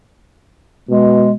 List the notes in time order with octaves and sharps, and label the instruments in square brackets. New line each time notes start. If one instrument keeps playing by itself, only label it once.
[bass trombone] B2 [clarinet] G#3